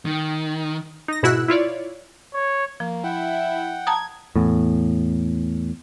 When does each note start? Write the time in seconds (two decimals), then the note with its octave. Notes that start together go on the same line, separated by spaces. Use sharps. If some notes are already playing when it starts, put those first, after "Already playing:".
0.05 D#3
1.08 D#4 A#6
1.23 G#2 B2 E4 F#4 E6 F#6
1.48 E4 F4 C#5 D5
2.34 C#5
2.80 F3 A#3
3.04 E4 F#5 G5
3.87 A5 A#5 D#6 G#6
4.36 E2 A2